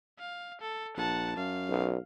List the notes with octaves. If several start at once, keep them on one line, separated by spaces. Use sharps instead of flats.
F5
A4
A#1 F#5 A5
F#2 F5
B1